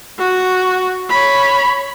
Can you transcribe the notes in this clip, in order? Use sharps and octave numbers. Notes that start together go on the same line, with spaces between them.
F#4
C#5 B5